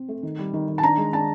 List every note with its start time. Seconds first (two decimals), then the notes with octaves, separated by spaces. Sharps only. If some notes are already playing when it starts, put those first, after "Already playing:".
Already playing: C4
0.08 A3
0.23 D#3
0.38 G3
0.53 D#3
0.68 D#3
0.78 A5
0.83 D4 A#5
0.97 G#3
1.13 D4 A5